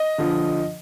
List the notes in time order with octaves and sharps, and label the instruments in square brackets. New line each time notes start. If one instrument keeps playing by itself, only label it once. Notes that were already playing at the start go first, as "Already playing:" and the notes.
Already playing: [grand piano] D#5
D3 F3